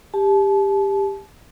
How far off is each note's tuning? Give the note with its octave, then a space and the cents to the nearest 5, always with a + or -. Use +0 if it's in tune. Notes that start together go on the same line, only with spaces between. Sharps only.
G4 +15 A5 -35